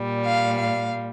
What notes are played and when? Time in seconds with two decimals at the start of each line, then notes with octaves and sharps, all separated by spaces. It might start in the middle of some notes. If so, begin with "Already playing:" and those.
Already playing: A#2 G3
0.24 F5
0.59 F5